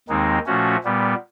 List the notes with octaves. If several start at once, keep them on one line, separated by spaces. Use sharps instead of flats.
D#2 D#3 G#3 C4 D#4
A#2 F3 A3 C#4 F#4
A#2 G3 B3